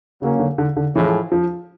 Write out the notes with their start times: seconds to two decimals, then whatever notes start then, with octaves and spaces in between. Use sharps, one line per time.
0.22 C#3 F#3 A#3 C#4
0.39 D3
0.58 D3
0.76 D3
0.95 A2 E3 F3 G#3
1.32 F3